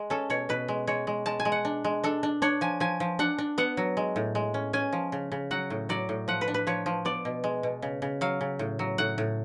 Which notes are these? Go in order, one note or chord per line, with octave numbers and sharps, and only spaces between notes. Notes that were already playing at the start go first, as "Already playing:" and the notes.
Already playing: G#3
C#4 A4
B2 C#5
B2 B4
G#3
G#3 C#5
G#3
G#3 A5
G#5
G#3
F#5
D4
G#3
D4 A4
D4
D4 C#5
F3 G#5
F3 G#5
F3
D4 F#5
D4
B3 F#5
F#3
G#3
A2
G#3
C#4
C#4 G#5
F3
C#3
C#3
F#3 F#5
A2
F#3 D5
A2
F3 F#5
B4
D4
B4
F3 C#5
F3
B3 D5
B2
G#3
B2
C#3
C#3
F#3 F5
C#3
A2
F#3
A2 F#5
A2